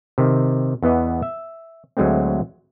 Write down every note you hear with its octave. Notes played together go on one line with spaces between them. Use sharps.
C3 D#3
E2 E3 B3 D#5
E5
D2 F#3 G#3 A3 C4